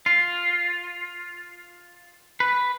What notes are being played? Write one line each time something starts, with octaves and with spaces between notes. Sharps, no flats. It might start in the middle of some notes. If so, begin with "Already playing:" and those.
F4
B4